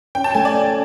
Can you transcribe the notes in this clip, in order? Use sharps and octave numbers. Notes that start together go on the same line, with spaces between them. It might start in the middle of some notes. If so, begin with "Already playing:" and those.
C#4 G5
A5
A3 G#5
D5
C#4